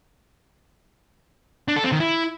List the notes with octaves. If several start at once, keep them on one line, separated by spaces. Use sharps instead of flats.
D4
A4
C4
D#3
E4